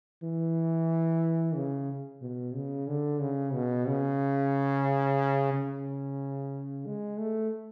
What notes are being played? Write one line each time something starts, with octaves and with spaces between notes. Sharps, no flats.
E3
C#3
B2
C#3
D3
C#3
B2
C#3
C#3
G#3
A3